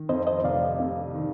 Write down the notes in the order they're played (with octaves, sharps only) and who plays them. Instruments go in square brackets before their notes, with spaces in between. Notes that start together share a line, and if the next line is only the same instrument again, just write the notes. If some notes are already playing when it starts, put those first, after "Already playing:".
Already playing: [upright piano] D#3
[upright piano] F2 [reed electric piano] C5 D#5
[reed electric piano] C5 D#5
[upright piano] F1 [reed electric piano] D5 F5
[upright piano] C3
D#3